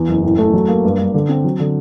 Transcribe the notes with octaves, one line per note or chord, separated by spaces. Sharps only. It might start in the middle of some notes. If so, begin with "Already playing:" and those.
Already playing: E2
F#1
A2
A3
F#3
A#3
G2
G2
D3
C4
F#3
D3